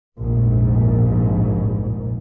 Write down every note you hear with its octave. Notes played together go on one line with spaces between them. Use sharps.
F1 A#1 G#2